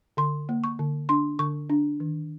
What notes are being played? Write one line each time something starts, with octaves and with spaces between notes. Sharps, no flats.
D3 C6
A#3
C#6
D3
D4 C6
D3 C#6
D4
D#3